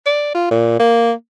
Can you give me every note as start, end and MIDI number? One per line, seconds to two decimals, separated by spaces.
0.06 0.32 74
0.35 0.50 65
0.51 0.77 46
0.80 1.12 58